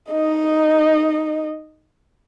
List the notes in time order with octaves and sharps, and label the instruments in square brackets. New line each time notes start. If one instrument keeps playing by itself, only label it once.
[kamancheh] D#4 D#5